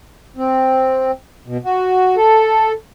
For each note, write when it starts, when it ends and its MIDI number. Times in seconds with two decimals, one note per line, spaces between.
0.37 1.11 60
1.47 1.57 47
1.64 2.15 66
2.17 2.72 69